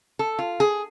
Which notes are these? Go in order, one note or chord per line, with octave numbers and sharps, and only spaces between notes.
A4
F4
G#4